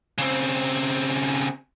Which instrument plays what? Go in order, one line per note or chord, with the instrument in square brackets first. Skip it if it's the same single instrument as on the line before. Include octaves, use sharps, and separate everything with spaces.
[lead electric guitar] C#3 C4